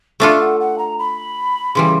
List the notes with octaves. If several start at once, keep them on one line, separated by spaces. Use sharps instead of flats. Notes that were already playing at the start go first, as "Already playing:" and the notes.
A3 D4 F4 A4 E5
F#5
F#5
A#5
B5
C#3 E3 G3 C6